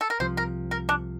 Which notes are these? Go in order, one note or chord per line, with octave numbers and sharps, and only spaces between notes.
A4
A#4
C2 C3 F3 C5
A#4
A#4
D4